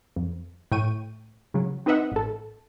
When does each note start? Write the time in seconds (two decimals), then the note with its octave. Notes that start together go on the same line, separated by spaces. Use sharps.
0.16 F2
0.72 A2 G5 C#6 D#7
1.54 C#3 F#3
1.86 C4 D#4 B4 D#5 E5 F#5
2.12 A1 A4